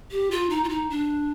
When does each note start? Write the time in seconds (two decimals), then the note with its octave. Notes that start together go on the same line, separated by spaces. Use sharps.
0.11 G4
0.31 F4
0.50 D#4
0.64 F4
0.69 D#4
0.90 D4